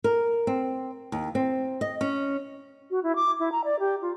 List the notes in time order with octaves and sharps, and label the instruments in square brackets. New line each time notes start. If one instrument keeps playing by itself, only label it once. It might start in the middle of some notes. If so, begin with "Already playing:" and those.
[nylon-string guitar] A#4
C4
D#2
C4
D#5
C#4
[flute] F#4
E4
D6
E4
A#5
D5
G4
F4